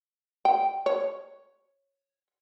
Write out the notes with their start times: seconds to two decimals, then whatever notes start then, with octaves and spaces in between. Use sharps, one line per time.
0.45 G5
0.86 C#5